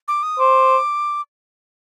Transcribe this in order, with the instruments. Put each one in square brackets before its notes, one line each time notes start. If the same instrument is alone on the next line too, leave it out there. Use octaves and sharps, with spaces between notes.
[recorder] D6
D#6
[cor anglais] C5 [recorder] D6